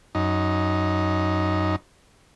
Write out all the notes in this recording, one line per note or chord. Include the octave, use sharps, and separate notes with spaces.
F#2 D#4